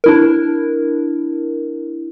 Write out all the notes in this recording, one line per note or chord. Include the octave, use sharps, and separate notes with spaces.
D4 E4 A#4